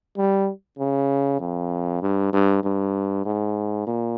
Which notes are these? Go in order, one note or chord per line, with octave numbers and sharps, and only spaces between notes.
G3
C#3
F2
G2
G2
G2
G#2
A#2